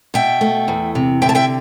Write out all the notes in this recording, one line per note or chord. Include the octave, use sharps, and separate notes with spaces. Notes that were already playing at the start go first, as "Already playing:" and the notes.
B2 E5 G5
A3
E2
C3
D3 E5 G5
A5
E5 G5